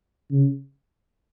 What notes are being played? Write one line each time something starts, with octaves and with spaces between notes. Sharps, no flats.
C#3